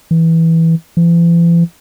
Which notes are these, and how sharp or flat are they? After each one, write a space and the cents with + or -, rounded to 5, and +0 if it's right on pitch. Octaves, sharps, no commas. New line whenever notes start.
E3 -10
E3 +45